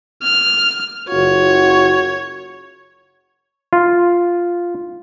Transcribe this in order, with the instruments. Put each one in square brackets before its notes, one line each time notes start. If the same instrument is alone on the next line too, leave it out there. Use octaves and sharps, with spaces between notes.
[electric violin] F6
[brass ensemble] F#1 F4 F#4 [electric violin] C#5
[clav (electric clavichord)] F4